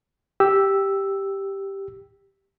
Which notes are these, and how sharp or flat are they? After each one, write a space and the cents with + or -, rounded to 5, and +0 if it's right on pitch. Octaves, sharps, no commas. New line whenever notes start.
G4 +0 E6 +0